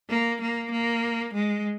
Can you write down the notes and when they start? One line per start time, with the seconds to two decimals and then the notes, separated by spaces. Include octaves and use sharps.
0.10 A#3
0.41 A#3
0.72 A#3
1.34 G#3